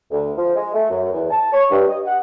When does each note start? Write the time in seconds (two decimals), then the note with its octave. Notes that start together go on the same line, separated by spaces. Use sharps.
0.11 D2
0.37 F3
0.55 G#3
0.73 A3
0.90 F#2
1.11 E2
1.30 A5
1.52 C#5
1.70 G2
1.88 D#5
2.05 F#5